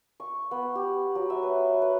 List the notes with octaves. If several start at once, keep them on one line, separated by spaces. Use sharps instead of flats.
C#6
B3
G4
F#3
E5
B4
B4